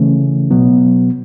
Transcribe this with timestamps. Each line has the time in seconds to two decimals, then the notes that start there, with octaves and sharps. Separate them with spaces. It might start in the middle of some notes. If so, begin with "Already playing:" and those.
Already playing: C#3 E3 A3 C#4
0.51 B2 F#3 B3